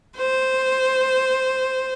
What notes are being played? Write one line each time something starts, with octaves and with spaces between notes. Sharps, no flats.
C5